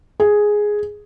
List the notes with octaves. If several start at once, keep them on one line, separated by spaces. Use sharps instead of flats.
G#4